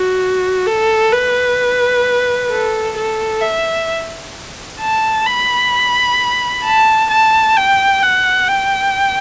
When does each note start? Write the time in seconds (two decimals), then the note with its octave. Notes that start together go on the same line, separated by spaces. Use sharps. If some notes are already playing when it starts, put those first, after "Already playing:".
Already playing: F#4
0.67 A4
1.13 B4
2.50 A4
2.96 A4
3.42 E5
4.80 A5
5.26 B5
6.64 A5
7.10 A5
7.57 G5
8.02 F#5
8.48 G5